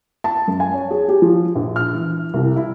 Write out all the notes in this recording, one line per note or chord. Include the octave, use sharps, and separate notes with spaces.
A5
F#2
G#5
C#5
G#4
G4
F3
A#1
F6
E3
C2
E4